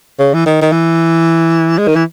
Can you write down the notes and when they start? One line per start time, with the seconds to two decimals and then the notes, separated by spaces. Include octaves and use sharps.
0.19 C#3
0.34 E3
0.46 D#3
0.62 D#3
0.72 E3
1.78 G#3
1.87 D#3
1.96 E3